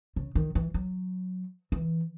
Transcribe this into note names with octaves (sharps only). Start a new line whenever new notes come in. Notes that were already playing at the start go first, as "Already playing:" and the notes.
C#3
D#3
E3
F#3
E3